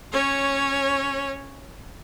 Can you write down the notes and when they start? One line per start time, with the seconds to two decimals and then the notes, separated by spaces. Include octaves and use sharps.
0.12 C#4 C#5